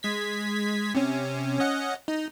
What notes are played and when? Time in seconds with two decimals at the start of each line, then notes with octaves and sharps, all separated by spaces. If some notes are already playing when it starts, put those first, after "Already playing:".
0.03 G#3 G#6 B6
0.95 C3 C#4
1.59 C#4 D#5 F#5
2.08 D#4